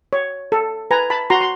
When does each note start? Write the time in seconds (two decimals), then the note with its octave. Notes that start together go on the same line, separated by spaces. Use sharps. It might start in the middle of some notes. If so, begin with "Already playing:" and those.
0.13 C#5
0.52 A4
0.91 B4 G#5 A#5
1.10 A5 B5
1.30 F#4 A#5 C6
1.41 C6